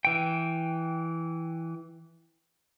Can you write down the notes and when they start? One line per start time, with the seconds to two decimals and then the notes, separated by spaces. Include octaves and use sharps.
0.05 E3 G5